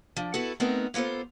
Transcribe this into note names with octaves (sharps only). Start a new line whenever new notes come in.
F3 D4
B3 E4 F#4 A4
A3 B3 C4 D#4 A#4 F#5
A#3 B3 F4 A4 C5